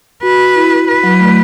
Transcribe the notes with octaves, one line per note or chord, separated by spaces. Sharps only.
F#4 B4
E4
B4
F#3
A3